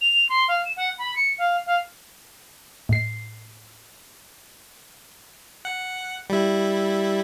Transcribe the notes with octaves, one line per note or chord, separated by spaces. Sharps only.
F7
C6
F5
E7
F#5
B5
C#7
F5
F5
A2 C7
F#5
G3 E4